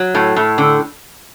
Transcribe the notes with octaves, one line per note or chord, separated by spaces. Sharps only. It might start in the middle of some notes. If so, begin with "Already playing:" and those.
Already playing: F#3
A2
A2
D3